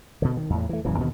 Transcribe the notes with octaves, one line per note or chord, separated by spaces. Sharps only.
B2 D3
D#3
E2 A2
E3 A3
D#1 F#2 E3
D#2 B2 D3